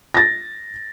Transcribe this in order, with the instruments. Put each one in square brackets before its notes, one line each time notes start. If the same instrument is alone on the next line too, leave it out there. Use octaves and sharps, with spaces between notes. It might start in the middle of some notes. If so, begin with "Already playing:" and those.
[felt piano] A6 A#6